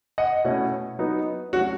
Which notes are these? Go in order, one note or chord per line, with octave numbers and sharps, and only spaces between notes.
D#5 F#5
B2 A3 C#4 E4
F#3 B3 D#4
F#3 A3 C#4 F#4